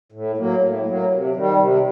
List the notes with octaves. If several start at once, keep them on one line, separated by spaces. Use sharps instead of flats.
A2
F#3 A#3
A2
F#3 A#3
C3
D#3 G3
C3